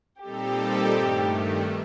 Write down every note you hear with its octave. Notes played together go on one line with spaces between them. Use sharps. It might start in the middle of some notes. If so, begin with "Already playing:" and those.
A#2 G3 C4 D#4 G4 A4
G2 D#3 A3